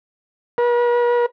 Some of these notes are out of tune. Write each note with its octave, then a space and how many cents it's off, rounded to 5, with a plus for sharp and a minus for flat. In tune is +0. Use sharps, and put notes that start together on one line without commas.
B4 -45